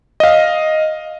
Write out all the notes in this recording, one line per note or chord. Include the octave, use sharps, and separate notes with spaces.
D#5 F5